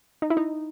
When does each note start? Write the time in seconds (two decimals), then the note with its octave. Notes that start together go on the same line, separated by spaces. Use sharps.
0.22 D#4
0.30 E4
0.37 D#4